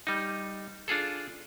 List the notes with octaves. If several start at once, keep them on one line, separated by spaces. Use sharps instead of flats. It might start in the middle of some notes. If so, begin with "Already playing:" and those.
G3 D#4
D4 F4 G#4 A4